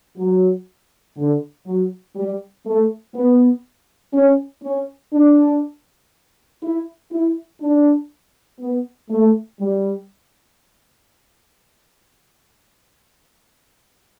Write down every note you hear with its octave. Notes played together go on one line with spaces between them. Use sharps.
F#3
D3
F#3
G3
A3
B3
C#4
C#4
D4
E4
E4
D4
B3
A3
G3